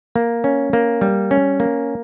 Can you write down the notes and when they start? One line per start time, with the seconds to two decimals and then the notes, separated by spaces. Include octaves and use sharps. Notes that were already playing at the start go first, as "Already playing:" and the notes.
0.16 A#3
0.44 C#4
0.73 A#3
1.01 G3
1.31 C#4
1.60 A#3